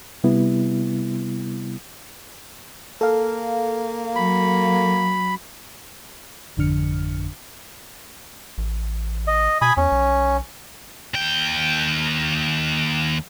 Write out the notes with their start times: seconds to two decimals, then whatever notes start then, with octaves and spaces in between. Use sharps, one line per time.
0.24 C3 G3 B3 E4
3.01 A#3 A4 F5
4.16 F#3 B5
6.57 G#1 F2 D3 D4 F6 C#7
8.58 A1
9.27 D#5
9.61 B2 G#5 B5 D#6
9.77 E2 C#4
9.92 B1
11.14 D#2 G5